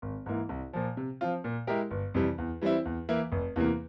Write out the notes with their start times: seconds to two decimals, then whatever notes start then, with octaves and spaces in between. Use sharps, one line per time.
0.02 G#1
0.26 G#2 E3 A#3 E4
0.49 C2
0.73 A#2 F3
0.97 C3
1.21 F3 C4 F4
1.44 A#2
1.67 G#3 E4 G4 A#4
1.91 G1
2.14 F2 C3 E3 G3
2.38 E2
2.61 E3 G3 C4 E4
2.85 E2
3.09 E3 A#3 E4
3.32 F1
3.56 E2 C3 E3 A#3